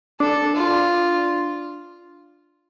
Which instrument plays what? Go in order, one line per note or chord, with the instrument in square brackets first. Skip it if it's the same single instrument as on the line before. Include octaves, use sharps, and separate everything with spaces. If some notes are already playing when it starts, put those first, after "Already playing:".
[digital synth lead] D4 [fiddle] A4
[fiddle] F4